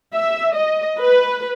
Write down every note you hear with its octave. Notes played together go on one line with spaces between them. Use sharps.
E5
D#5
B4